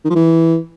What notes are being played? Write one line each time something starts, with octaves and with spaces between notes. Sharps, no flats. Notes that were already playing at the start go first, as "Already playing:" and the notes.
D#3
F3
E3